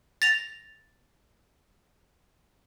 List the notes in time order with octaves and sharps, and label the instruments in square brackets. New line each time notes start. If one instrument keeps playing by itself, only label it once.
[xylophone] A6 A#6 F7